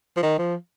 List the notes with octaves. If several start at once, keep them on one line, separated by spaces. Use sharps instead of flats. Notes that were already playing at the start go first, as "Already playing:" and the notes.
F3
D#3
F3